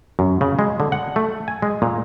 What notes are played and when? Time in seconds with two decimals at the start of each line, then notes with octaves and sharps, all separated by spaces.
0.19 F#2
0.41 C#3
0.59 G#3
0.80 D3
0.92 F#5
1.16 A3
1.48 G#5
1.62 G#3
1.82 A#2